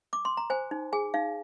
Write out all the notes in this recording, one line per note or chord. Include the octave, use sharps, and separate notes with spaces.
D6
C6
A#5
C5 G#5
D#4
G#4 G#5
D#4 F5